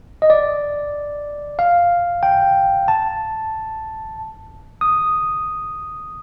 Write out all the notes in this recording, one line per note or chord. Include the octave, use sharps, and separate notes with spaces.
D#5
D5
F5
G5
A5
D#6